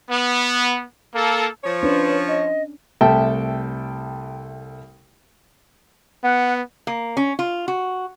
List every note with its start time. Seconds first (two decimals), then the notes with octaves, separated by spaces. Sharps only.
0.11 B3
1.15 A#3 A4
1.64 F3 C#5
1.83 C#4 D4 B4
2.28 D#5
3.01 C2 A3 A4 E5 G5 A5
6.24 B3 F#5
6.87 A#3
7.17 C#4
7.39 F4
7.68 F#4